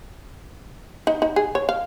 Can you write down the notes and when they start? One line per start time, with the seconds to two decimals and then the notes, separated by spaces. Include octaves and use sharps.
1.07 D#4
1.22 D#4
1.36 G#4
1.55 C#5
1.69 F5